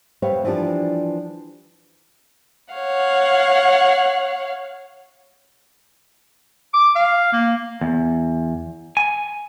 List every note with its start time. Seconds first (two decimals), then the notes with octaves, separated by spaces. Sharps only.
0.22 G3 B3 C5 C#5 E5 F5
0.45 E3 F3 G3 D4 A5
2.74 C#5 F5 F#5
6.74 D6
6.95 F5
7.33 A#3
7.81 E2
8.97 G#5